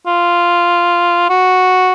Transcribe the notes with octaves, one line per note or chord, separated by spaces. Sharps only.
F4
F#4